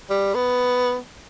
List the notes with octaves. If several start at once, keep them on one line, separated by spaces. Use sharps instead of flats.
G3
B3